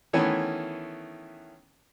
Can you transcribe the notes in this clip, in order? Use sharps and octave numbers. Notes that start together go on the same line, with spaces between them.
D#3 E3 A3 B3 C#4